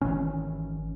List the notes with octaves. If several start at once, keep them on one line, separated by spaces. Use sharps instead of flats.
G#1 D#3 E3 C#4